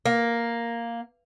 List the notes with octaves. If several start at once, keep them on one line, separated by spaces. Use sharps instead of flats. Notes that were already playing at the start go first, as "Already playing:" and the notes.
A#3